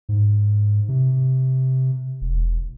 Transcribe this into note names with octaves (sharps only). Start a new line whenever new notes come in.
G#2
C3
E1